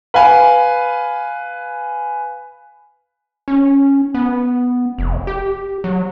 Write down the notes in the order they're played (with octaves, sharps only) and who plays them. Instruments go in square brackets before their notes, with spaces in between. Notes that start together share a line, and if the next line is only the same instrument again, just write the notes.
[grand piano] B4 F5 G#5
[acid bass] C#4
B3
F1
G4
F#3